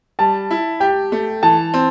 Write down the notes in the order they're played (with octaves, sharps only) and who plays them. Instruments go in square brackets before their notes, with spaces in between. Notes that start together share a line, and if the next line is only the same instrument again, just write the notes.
[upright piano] G3 [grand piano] A5
[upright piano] E4
[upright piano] G4 [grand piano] G5
[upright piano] A3
[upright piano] E3 [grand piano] A5
[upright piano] C4